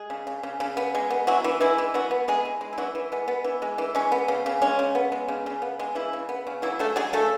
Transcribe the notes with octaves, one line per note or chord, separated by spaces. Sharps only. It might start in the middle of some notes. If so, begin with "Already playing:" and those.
Already playing: G#3 G#4
C#3
C#3
C#3
C#3
B3
G#3
B3
E3 F#3 F#4
E3
E3 G#3 E4
E3
F#3 B3 F#4
B3
E3 G#3 G#4
G#3
G#3
E4
E3 F#3 F#4
E3
G#3 B3
B3
E3
G#3
E3
G#3 C#4
B3
C#3
C#3
G#3 C#4
C#3
B3
G#3
C#3
C#3
B3
G#3
C#3 E3 E4
C#3
B3
C#3
E3 F#3 E4
C#3 A3 A4
F#3 G#3 G#4
C#3 A3 A4